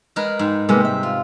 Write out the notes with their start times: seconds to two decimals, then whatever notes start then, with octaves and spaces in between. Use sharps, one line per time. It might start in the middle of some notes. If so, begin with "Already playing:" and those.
0.16 G#3 A#4 B4
0.39 G#2
0.69 C3 G#3 A#3 B3
0.85 E5
1.03 F4